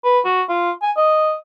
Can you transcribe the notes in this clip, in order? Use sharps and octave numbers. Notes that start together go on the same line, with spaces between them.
B4
F#4
F4
G#5
D#5